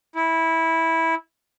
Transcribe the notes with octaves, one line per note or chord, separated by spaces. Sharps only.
E4